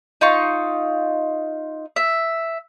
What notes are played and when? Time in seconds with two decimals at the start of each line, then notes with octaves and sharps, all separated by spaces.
0.21 D#4 F4 C#6
1.96 E5